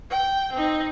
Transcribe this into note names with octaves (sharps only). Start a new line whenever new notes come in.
G5
C4 D#4